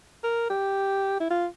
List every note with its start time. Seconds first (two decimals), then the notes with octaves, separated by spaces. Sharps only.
0.24 A#4
0.50 G4
1.20 E4
1.30 F4